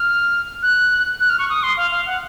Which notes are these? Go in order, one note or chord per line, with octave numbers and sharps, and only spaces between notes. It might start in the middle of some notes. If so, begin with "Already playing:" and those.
Already playing: F6
F#6
F#6
F6
C#6
D#6
C6
F5
F5
F#5